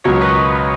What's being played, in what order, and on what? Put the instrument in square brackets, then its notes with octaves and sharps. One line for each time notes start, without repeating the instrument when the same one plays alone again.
[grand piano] C#2 B2 F#3 [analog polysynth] A#4 C#5
[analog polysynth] B4 D#5